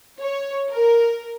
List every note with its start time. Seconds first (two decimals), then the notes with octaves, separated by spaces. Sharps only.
0.19 C#5
0.71 A#4